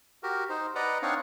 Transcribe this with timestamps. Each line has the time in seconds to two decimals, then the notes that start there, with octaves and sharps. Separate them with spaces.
0.23 F#4 G4 A#4
0.49 D#4 C5
0.75 B4 D5 D#5 F#5 A#5
1.02 C4 D4 D#4 C#5 F5 F#5